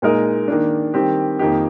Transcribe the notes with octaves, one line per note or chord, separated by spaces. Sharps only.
A#2 G#3 D#4 A#4 D#5
D#3 A#3 D4
D#3 G3 C4 G4
F2 D#3 A#3 D#4 G4